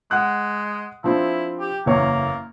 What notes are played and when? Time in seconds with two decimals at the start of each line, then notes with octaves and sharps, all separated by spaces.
0.11 G#3 F#5 F#6
1.04 F3 C4 D4 E4
1.60 G4
1.86 F#1 E2 A#3 C#5